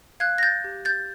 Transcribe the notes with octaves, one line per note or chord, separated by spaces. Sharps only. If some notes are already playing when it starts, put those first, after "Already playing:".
F5 F#6 G#6
A#6
G6 A6
G4
G6 A6